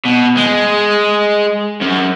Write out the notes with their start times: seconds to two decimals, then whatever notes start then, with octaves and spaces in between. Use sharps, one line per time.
0.05 B2
0.37 G#3
1.81 F#2